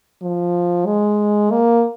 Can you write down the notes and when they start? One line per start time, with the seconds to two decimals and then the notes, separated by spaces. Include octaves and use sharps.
0.22 F3
0.86 G#3
1.51 A#3